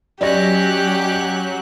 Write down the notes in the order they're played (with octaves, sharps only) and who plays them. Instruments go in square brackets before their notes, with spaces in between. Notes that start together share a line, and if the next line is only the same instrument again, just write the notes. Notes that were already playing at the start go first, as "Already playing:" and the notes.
[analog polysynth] F#3 [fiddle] C#4 F#6 [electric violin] G4 [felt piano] D5 D#5 A#6